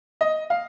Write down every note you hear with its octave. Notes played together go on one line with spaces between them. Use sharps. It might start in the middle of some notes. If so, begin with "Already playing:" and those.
D#5
F5